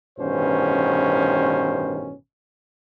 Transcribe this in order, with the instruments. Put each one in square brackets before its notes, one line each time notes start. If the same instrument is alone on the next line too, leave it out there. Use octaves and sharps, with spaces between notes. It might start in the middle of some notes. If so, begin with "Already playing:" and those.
[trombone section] A1 G2 B2 D#3 C#4 C5